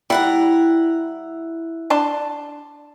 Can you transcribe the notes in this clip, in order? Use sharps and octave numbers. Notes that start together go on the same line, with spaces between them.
G3 E4 F#5 A#5
D4 A5 C6